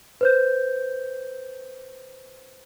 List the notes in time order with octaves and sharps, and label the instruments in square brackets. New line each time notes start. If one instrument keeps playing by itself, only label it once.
[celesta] B4 C5 G6